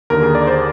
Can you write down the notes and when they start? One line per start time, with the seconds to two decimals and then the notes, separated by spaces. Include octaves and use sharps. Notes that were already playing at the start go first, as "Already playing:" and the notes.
0.10 D#2 D3 A#4
0.22 G#4
0.35 D5
0.47 C5